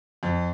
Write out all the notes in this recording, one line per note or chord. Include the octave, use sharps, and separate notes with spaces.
F2